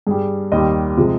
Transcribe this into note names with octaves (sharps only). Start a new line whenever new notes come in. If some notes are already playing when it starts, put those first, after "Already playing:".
G2 G3 G#4
D#2 D#3 G3 D#5
C3 F3 G#3